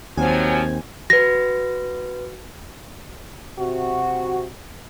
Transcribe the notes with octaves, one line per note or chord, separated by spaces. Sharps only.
D#2 F3 F#3 C4 C5 G#5
F#4 B4 A#6
C3 F#4